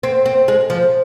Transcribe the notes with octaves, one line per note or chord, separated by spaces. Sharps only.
C4
C4
G#3
F3